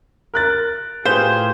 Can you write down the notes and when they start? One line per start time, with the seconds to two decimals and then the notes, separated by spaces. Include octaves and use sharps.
0.34 A#4 F#6 A6
1.05 A2 F4 G4 G#4 B4 C5 F5